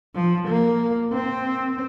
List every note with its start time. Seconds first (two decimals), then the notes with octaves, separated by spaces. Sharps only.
0.15 F3
0.48 A#3
1.13 C4